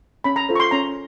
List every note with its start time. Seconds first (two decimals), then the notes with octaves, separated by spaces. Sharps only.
0.24 C#4 B5
0.36 A#5
0.49 F4 A4 C5
0.55 C#6
0.60 C6
0.71 C#4 A#5